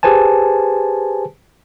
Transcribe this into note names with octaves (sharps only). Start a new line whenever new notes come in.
G4 G#4 B4 C5 G#5 A5